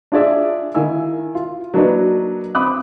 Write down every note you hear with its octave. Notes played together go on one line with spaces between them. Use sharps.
D4 F4 G#4 D5 E5
D#3 E4 F5 G#5 E6
F4
F#3 A#3 D4 D#4 F#4 B4
C4 B5 D6 D#6 F#6